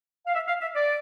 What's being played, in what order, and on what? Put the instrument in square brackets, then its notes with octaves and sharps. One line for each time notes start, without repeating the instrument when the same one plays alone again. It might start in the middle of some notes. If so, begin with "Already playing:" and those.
[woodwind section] F5
E5
F5
E5
D5